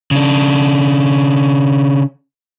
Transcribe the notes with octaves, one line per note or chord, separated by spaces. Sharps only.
C#3 D4